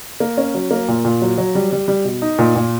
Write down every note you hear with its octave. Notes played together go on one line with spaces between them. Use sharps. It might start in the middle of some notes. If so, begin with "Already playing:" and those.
A#3
C#4
F#3
A#3
A#2
A#2
F#3
F#3
G3
G3
G3
B2
D#4
A#2
A#2